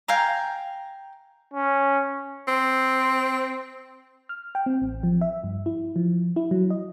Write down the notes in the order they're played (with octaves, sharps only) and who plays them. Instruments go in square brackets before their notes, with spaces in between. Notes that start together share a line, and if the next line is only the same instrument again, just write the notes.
[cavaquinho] F5 G5 G#5 A#5
[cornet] C#4
[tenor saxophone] C4
[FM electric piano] F6
G5
C4
A1
F3
E5
G2
E4
F3
E4
F#3
D#5